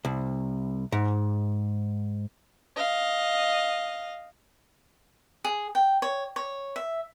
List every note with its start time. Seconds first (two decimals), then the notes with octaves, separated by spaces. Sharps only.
0.05 C2
0.92 G#2
2.76 D#5 F5
5.44 G#4
5.75 G5
6.02 C#5
6.36 C#5
6.76 E5